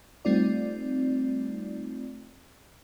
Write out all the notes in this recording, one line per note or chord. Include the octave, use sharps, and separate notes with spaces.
G3 A3 C4 D#4 F4 D5